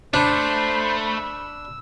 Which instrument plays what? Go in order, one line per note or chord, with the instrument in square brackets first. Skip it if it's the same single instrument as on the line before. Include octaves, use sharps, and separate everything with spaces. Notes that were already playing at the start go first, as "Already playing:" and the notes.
[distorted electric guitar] A3 [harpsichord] D4 [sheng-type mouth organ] C5 [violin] B5
[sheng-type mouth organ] E6